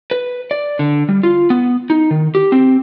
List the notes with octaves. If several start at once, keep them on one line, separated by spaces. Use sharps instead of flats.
B4
D5
D3
G3
F4
B3
D#4
D#3
G4
C4